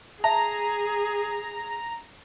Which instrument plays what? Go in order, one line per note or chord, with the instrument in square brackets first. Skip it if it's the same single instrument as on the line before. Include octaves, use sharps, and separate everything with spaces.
[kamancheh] G#4 [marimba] E5 A5 [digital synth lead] A#5